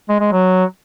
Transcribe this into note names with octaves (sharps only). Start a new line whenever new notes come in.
G#3
G#3
F#3